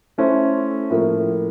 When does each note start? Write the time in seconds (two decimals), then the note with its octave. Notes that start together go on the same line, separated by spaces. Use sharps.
0.18 A3 C#4 E4 A4 C5
0.90 A2 F3 A#3